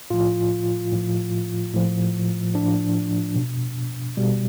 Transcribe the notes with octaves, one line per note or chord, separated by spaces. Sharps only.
A2 F3 F4
A2 F3
A2 F3
A2 F3 D4
B2
B2 G3